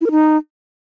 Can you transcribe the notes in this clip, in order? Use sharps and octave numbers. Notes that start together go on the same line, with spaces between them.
E4
A#4
D#4